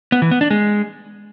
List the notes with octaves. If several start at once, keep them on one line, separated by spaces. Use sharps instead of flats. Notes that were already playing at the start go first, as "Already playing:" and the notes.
B3
E3
B3
D4
G#3